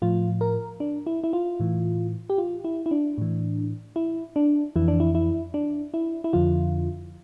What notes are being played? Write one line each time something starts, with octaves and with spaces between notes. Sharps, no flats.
A2 F3 F4
A#4
D4
E4
E4
F4
A2 E3
G4
F4
E4
E4
D4
A2 E3
E4
D4
F2 E3 E4
D4
E4
E4
D4
E4
E4
F2 D3 F3 F4